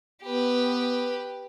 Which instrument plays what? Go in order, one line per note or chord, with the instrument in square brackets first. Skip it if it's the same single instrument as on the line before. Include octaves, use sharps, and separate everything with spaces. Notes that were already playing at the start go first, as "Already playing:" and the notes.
[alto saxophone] B3 [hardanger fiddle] G4 B4